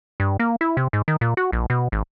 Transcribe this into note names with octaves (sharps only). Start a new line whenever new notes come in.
G2
A#3
E4
C3
G#2
D#3
A#2
F#4
A#1
B2
G#1